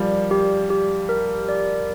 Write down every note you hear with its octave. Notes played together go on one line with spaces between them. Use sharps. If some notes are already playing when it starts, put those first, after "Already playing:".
Already playing: F3 G3 A#4 D5
G4
G4
A#4
D5